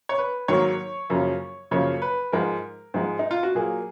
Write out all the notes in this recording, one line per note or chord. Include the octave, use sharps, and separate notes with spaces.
C#5
B4
G#2 D#3 F#3 A#3 C#5
F#2 C#3 F3 A#3
F#2 C#3 F3 A#3 C#5
B4
G#2 F3 G#3 A#4
G#2 F3 G#3
D#4
F4
F#4
A#2 F#3 A#3 G#4